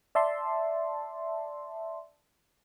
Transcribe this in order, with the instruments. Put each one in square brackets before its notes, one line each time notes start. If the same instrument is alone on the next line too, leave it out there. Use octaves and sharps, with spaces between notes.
[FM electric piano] D5 E5 A5 C6